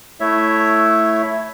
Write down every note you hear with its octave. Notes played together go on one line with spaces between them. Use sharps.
A3 E4 C#5 E5